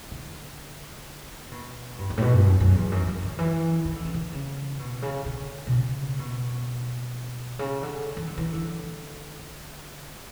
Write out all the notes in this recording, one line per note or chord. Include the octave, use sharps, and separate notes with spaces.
D3
B2
G2
F#2
A2
B2
G2
F#2
F#2
E2
F#2
F#2
D3
E3
E3
D3
C#3
D3
C#3
B2
C#3
D3
B2
C#3
B2
C#3
D3
E3
D3
E3
D3